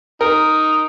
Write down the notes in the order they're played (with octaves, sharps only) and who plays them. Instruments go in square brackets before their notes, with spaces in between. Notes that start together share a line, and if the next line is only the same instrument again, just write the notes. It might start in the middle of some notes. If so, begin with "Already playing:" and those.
[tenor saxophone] D#4 [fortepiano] A#4